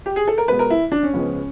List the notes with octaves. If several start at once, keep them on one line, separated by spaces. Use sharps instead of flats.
G4
G#4
A4
A#4
B2 G#3 B3 B4
A#4
E4
D4
C#4
C#2 C#3 F3 G#3 B3